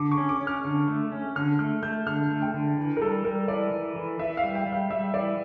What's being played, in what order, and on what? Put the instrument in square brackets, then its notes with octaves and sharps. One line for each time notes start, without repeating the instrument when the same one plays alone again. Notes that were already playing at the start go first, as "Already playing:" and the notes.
Already playing: [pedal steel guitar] D3 [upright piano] D6
[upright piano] C#6
[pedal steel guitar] C#4
[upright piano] D6
[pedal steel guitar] C#4
[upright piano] F6
[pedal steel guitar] D3
A3
C#4
[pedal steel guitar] D3 [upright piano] F6
[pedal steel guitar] A3 [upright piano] F6
[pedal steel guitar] A3 [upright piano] G6
[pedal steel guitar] D3 [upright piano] F6
[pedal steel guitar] A3
[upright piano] G5
[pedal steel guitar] D3
E3
[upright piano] A#4
[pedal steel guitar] G3 [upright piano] A4
[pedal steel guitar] G3 [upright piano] A#4
[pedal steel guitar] E3 [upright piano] D5
[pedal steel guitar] E3
E3
[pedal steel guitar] E3 [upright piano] E5
[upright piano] F5
[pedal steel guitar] G3
[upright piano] G5
[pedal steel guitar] G3
[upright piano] F5
[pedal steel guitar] G3 [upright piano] E5
[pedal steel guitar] E3 [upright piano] D5